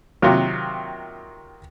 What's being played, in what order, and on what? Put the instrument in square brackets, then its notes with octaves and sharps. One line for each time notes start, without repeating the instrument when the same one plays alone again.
[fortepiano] C3 D#3 F#3 A#3 F4